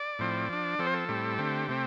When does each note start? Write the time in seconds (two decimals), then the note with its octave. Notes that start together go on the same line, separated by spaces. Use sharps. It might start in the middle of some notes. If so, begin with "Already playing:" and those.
Already playing: D5
0.19 A2 F3 C4
0.49 F3 D4
0.79 F3 C4 A4
0.87 C5
0.94 A4
1.09 A2 G3 C4
1.38 D3 A3 C4 G4
1.69 C3 A3 C4